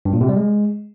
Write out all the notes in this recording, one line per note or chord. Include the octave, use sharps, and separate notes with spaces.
G2
A#2
C3
G3
G#3